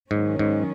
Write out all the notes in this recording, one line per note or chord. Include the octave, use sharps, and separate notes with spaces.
G#2 D#3 F#3 C#4
G#2